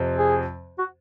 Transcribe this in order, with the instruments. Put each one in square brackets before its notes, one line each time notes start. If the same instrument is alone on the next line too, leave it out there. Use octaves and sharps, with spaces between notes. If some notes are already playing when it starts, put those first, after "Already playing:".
Already playing: [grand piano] F2 C3 F3 C4
[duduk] G#4
F#4